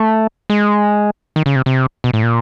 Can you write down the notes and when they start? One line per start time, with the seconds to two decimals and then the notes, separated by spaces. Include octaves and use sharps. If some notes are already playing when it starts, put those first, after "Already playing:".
Already playing: A3
0.50 G#3
1.36 D#3
1.46 C#3
1.56 C3
1.66 C3
2.04 B2
2.13 A2
2.23 A#2